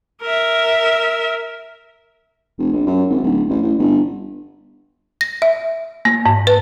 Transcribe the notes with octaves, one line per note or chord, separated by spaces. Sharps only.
A#4 E5
F1
A#1
F#2
G#1
D1
A1
A1
G1
A#6
E5
A#3
G#2
B4